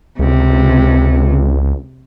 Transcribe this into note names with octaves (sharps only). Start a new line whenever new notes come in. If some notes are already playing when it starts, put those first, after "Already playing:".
C#2 C3